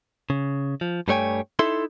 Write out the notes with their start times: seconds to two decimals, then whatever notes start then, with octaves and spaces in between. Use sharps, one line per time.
0.30 C#3
0.81 F3
1.08 G2 G3 A3 C#5 G5 G#5
1.59 D#4 E4 A4 E5 C6